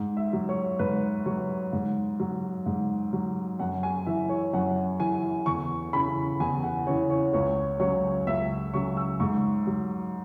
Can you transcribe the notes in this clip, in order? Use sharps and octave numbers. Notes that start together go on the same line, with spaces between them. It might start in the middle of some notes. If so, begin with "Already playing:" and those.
Already playing: G#2
E5
F#3
C#5
G#2 B4
F#3 C#5
G#2
F#3
G#2
F#3
F#2 F#5
G#5
E3 E5
C#5
F#2 F#5
E3 G#5
E2 C#6
C#3 E3 B5
E2 G#5
F#5
C#3 E3 C#5
C#5
C#2 C#5
C#3 F#3 C#5
C#2 E5
C#3 F#3 C#6
E6
G#2 C#6
F#3